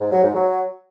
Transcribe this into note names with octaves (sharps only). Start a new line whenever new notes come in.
G#2
F#3
G#2
F#3